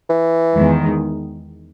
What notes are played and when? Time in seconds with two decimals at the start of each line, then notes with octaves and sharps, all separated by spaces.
0.09 E3
0.54 E2 D#3 G#3